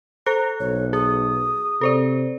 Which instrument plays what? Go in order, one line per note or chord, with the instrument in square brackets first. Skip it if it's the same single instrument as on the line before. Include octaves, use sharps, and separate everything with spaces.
[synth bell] A4 C5 F#6 [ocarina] A#5
[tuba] B1 [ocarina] C#5
[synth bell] G#4 [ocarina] D#6
[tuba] C3 [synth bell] A4 C5 D5